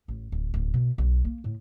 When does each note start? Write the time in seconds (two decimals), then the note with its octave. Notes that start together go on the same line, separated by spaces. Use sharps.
0.08 A1
0.32 D1
0.54 D1
0.74 B2
0.98 B1
1.25 A#3
1.44 A2